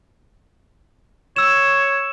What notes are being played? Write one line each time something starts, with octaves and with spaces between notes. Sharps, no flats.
C#5 E6 E7